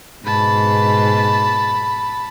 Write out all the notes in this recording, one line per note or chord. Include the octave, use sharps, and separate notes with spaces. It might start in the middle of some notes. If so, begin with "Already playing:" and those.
G#2 B2 B3 A5 B5